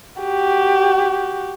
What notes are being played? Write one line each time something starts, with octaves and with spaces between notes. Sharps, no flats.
F#4 G4